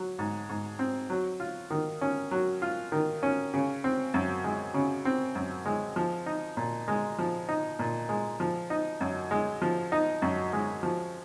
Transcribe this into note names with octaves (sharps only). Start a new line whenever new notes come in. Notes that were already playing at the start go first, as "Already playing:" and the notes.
Already playing: F#3
G#2
G#2
C4
F#3
F4
D#3
C#4
F#3
F4
D#3
C#4
C#3
C4
F#2
G#3
C#3
C4
F#2
G#3
F3
D#4
A#2
G#3
F3
D#4
A#2
G#3
F3
D#4
F#2
G#3
F3
D#4
F#2
G#3
F3